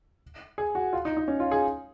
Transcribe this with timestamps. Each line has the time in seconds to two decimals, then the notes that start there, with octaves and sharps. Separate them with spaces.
0.58 G#4
0.75 F#4
0.93 F4
1.05 D#4
1.17 D#4
1.28 C#4
1.40 F4
1.51 G#4